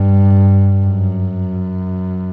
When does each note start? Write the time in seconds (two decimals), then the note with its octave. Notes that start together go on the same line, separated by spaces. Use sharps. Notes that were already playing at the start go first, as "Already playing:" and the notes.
Already playing: G2
0.86 F#2